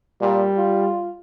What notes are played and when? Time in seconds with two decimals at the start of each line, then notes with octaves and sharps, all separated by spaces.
0.21 A#2 G3
0.57 F4